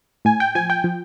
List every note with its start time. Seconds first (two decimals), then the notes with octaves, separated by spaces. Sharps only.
0.25 A2 G#5
0.40 G5
0.55 F3 G#5
0.70 G5
0.84 F3